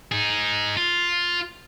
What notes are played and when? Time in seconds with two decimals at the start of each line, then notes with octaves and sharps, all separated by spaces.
0.12 D#4 G#4
0.77 F4